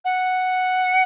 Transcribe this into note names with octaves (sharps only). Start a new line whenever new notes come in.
F#5